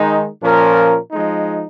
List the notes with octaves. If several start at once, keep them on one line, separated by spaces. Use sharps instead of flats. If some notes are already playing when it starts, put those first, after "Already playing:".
Already playing: D#3 G#3 D#4
A#2 F3 C#4 A#4
F3 G#3 D#4